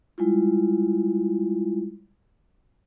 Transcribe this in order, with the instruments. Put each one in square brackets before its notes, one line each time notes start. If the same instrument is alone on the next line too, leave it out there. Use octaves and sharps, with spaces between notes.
[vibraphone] G3 G#3 E4 F4